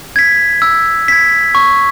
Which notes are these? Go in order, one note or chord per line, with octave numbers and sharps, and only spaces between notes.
G#6 B6
E6
G#6 B6
C#6